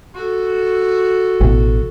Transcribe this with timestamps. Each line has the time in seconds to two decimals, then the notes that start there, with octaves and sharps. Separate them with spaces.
0.15 F#4 A4
1.41 A1 B2